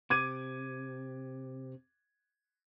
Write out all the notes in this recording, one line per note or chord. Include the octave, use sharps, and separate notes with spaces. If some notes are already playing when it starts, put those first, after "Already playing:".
C3 D6 G#6 D#7